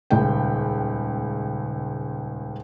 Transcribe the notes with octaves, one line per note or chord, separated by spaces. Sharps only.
D#1 C#2 G5